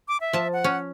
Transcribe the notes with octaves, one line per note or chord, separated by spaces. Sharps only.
D6
E5
F3 A5
F#5
C#4